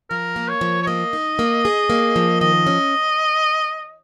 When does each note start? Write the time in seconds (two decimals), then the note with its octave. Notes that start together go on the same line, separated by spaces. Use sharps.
0.10 F3 A#4
0.36 A#3
0.48 C#5
0.61 F3
0.82 C#5
0.87 A#3 D#5
1.13 D#4
1.39 A#3
1.65 G#4
1.90 A#3
2.16 F3
2.41 D#3 D#5
2.67 C#4